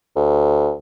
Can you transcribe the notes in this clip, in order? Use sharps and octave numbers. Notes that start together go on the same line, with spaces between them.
D2